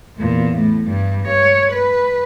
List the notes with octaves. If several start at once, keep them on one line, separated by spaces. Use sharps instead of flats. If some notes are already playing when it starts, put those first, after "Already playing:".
E2 A#2
A2
G2 G3
C#5
B4